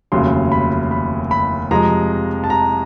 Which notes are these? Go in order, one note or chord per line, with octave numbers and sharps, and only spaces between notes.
F1 D#2 C#3 F#3 C6
B5
B5
B5
F2 C3 F3 G#3 A#5
A5
A#5